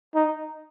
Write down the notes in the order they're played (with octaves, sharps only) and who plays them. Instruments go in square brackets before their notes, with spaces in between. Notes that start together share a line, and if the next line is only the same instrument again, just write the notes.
[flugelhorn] D#4